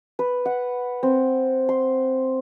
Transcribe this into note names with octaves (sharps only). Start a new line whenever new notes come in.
B4
F#5
C4
C6